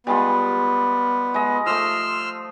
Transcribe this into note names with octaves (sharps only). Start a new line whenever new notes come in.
G3 G#3 B3 F4
G#3 D#5
F3 A3 C6 E6 F6